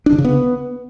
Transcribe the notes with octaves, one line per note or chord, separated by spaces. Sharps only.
D4
D3
C#3
B3